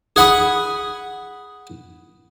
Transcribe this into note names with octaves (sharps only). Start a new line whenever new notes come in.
G#4 F#5 B5 D#6